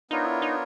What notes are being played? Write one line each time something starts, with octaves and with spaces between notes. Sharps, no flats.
B3 D4 D#4 F4 A#4 C#5
E4
D#4